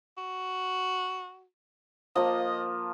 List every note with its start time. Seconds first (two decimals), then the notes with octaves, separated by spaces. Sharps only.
0.17 F#4
2.16 F3 A#3 D#5